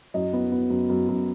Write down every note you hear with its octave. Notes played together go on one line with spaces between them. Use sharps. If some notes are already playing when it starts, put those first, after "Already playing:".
F#2 D#5
B3
B3
F#2
F#2
F#2